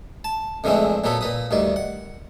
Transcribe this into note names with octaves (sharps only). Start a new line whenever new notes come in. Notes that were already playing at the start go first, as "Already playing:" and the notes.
A5
F2 D3 E3 G#3 A3 C4
A#2 F#3 B3 A4 B5
A#2 B4 D#6
D2 G2 D#3 D5
F#5